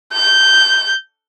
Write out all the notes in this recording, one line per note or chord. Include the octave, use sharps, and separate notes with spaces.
G6